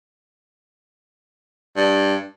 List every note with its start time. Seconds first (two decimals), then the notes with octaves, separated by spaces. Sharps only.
1.76 G2